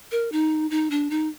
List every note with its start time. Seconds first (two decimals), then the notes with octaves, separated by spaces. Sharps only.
0.11 A#4
0.32 D#4
0.70 D#4
0.90 D4
1.10 D#4